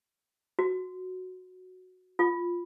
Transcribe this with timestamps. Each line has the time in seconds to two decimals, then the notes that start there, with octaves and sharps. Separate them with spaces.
0.59 F#4
2.19 F4